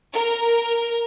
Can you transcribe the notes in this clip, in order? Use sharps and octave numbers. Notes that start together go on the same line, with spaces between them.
A#4